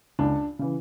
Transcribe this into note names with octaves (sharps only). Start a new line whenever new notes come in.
C#2 D4
C#3 E3